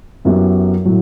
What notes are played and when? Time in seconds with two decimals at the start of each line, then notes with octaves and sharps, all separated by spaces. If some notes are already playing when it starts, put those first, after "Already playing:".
0.25 F#2 F#3 B3 E4 G4
0.85 A2 F#3